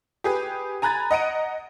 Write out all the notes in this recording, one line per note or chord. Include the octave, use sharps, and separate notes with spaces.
G4 G#4 B4
G#5 A#5 B5 F#6 G#6 A6
D#5 F#5 A#5 D7 D#7